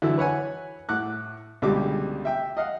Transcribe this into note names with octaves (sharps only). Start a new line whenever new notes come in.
D3 E3 F#3 E4 E6
B4 C#5 F#5 G#5
A2 F#5 D6 F#6
C#2 B2 D3 G3 G4 D6
E5 G5
D#5 F5 F#5